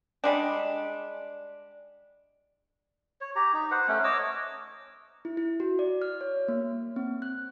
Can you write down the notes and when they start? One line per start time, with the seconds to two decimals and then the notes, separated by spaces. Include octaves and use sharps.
0.24 G3 G#3 D4
3.21 C#5
3.36 G4 A#5
3.53 D#4
3.71 B4 C5 F#5
3.88 A3 C#4
4.04 C#5 D#5 D6 E6
5.25 E4
5.37 E4
5.60 F#4
5.79 D5
6.02 F6
6.21 C#5
6.48 A#3
6.96 C4
7.22 F#6